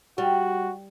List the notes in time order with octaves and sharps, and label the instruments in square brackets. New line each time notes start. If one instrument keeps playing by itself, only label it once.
[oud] G3 [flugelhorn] F#4